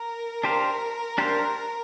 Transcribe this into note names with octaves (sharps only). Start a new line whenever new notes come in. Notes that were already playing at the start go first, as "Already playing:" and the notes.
Already playing: A#4
D4 G4 C5 F5
D4 G4 C5 F5